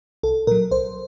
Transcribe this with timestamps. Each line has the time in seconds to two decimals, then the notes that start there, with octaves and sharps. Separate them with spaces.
0.23 C2 A4
0.47 A#2 F#3 A#4
0.71 C2 C5